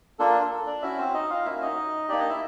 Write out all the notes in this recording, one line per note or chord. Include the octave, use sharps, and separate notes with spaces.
A#3 D4 F4 A4
A4
A4
D4 D5
C#4 E4 F#4 E5
C4 C5
D#4 D#5
F4 F5
A#3 C#4 E4 F#4 E5
D#4 D#5
A#3 D4 D#4 G4 D5
D#4 D#5
E4 E5